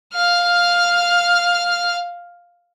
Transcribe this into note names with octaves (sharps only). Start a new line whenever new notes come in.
F5 F6